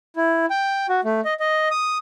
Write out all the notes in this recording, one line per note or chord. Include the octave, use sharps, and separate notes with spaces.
E4
G5
F#4
A3
D#5
D#5
D#6